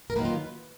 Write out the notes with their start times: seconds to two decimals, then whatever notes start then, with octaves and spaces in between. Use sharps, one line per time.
0.10 A#4
0.16 D#3 F#3 A#3 B4
0.25 F4